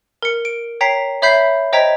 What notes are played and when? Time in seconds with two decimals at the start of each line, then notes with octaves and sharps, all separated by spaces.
0.22 A#4 C#7
0.45 D7
0.81 C#5 G5 A#5 B6 C7
1.22 C#5 E5 B5 G6 B6 C7
1.73 C5 D#5 G5 A#5 G#6 B6